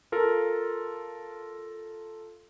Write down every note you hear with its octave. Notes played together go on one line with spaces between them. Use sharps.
F4 A4 A#4